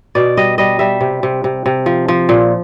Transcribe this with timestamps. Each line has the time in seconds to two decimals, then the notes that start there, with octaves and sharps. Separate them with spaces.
0.15 B2 D5
0.37 G3 D#5
0.58 G3 D#5
0.79 G3 E5
1.01 C3
1.23 C3
1.44 C3
1.66 C3
1.86 F3
2.08 F3
2.29 A#2